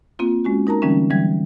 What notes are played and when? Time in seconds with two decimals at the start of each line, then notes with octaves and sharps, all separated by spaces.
0.19 A#3 C4 F4
0.44 G#3 C#4 F#4
0.67 D#4 A#4 A5 A#5
0.82 D3 E3 G3 A#3 C4 C#4
1.10 D3 E3 F#3 G3 G#6